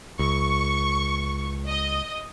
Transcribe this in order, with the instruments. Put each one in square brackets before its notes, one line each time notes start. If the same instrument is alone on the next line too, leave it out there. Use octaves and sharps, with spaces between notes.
[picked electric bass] C#2 [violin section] C#6
[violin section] D#5